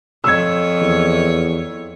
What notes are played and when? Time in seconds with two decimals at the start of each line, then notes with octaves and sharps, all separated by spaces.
0.24 F2 C#5 E6 G#6
0.81 E2